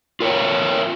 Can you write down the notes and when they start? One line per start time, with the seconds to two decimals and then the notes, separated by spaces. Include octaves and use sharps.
0.20 F4 A#4 C#5 G5